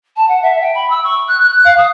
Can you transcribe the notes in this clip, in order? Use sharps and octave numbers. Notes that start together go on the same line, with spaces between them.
A5
F#5
E5
G5
B5
E6
C#6
F#6
F#6
F5
D#6